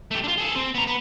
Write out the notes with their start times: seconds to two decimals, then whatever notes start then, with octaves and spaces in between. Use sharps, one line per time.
0.11 A3 G4
0.24 D4 F4
0.38 G#4 A4
0.56 C4
0.75 B3 A#5
0.87 B3